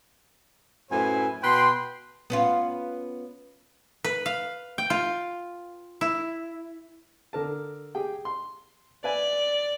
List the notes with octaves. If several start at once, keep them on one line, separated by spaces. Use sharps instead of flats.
F#2 A2 E4 B4 C5 G#5
B2 B4 G5 C6
B3 C#4 F4
B4
F5
G5
F4
E4
D3 A#4 A5
G4 G#4 G5
C6
B4 D5 E5 G#5